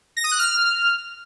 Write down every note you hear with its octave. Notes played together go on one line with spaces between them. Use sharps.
A#6
D#6
F#6
F6